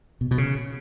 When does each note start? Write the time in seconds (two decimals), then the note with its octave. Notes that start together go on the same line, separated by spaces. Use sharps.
0.21 B2
0.31 B2
0.38 C#3